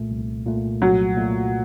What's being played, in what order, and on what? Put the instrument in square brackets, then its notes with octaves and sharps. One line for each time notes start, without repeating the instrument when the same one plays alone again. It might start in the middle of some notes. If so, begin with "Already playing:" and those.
Already playing: [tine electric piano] C2 A#2 A3
C2
A#2 A3
[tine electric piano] C2 [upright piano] F#3
[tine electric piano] A#2 A3